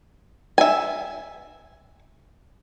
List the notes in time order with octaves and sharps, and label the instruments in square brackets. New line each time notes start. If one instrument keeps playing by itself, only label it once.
[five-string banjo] E5 G#5